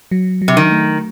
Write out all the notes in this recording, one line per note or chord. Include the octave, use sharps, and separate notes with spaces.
F#3
F#3
C3
D#3
A3